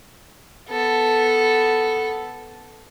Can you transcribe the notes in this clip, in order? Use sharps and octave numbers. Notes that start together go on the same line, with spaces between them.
B3 A4